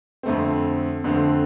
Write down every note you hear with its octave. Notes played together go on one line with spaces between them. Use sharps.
F2 D3 A3 C4
F2 D3 A3 C4